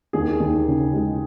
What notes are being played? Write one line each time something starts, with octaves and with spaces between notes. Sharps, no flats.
D#2 G#4
D#2
C#3
G#3